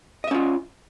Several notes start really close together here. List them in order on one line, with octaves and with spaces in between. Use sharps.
D#5 E5 C#4 F4